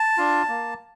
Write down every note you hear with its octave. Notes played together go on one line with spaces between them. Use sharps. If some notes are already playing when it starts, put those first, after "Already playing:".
Already playing: A5
D4 F4
A#3